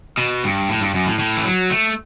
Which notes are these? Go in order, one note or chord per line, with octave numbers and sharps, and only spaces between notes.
B2
G2
A2
G2
F#2
A2
A2
E3
F#3
A3